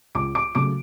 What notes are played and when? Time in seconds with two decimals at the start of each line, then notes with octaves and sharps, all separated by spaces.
0.15 C#2 D6 D7
0.35 D6 D7
0.55 C#3 F#3 A3 D6 D7